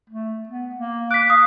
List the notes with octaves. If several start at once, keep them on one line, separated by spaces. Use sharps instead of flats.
A3
B3
A#3
D6 F#6 B6
F5 D#6